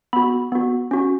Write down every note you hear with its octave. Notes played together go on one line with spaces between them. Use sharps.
B3 F#4 B5
B3 F#4
C#4 F#4